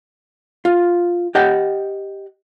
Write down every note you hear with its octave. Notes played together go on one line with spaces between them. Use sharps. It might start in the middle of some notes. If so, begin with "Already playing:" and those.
F4
G4 D#5 F#5 G5